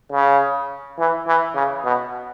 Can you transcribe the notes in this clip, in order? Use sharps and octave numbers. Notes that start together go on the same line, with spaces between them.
C#3
E3
E3
C#3
B2